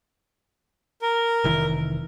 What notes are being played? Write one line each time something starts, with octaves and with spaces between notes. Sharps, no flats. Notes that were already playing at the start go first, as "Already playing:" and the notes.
A#4
F1 D#3 E3